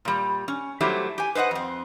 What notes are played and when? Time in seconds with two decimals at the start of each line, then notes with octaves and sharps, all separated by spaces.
0.05 A#2 G3
0.48 C#4
0.80 F#3 G3 A3 E4 G4 C5
1.18 G4 G#5
1.35 B4 C5 D#5 E5 F#5
1.51 F2 C4